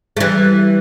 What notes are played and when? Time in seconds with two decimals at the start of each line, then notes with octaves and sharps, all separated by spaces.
0.17 A3
0.20 E3 G3